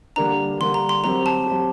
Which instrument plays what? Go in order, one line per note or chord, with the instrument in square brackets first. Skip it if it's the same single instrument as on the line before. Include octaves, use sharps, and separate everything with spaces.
[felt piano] D3 G3 A#3 D4 [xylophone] A#5
[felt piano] D3 G3 A#3 D4 [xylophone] C6
[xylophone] A#5
C6
[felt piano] F#3 C4 G4 [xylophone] A#5
[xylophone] A5
[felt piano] F#3 C4 G4